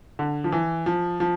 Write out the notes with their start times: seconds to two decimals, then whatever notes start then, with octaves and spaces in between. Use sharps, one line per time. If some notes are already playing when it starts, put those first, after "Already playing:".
0.19 D3
0.44 F3
0.52 E3
0.86 F3
1.20 F3